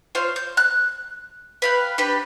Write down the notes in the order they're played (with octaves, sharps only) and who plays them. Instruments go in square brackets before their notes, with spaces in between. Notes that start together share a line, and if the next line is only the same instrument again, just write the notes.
[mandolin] F4 C5 C#5 F5
G6
F#6
B4 F5 G5
D4 G4 B4